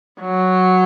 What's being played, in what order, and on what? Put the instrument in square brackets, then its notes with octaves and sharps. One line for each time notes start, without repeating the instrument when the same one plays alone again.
[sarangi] F#3